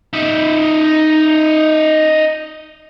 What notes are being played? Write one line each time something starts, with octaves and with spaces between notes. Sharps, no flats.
D#4 E5